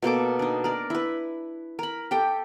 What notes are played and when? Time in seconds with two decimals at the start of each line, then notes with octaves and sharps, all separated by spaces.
0.02 B2 A#3 A4 D6
0.39 D4 D#4
0.64 A#4 D5
0.90 E4 B4
1.79 A#4 B5
2.11 G4 A4 G5